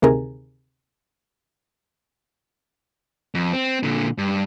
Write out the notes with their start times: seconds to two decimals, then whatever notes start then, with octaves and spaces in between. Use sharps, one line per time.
0.02 D2 C3 D#3 G#4 A#4
3.35 F2
3.53 C4
3.83 A#2 D3
4.18 G2